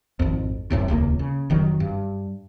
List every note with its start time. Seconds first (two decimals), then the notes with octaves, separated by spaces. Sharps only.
0.19 G#1 F2
0.70 D1 F#2 A2 C3
0.88 D#1 C#2 A2 A#3
1.19 C#3
1.50 F1 D#3 F#3
1.80 G2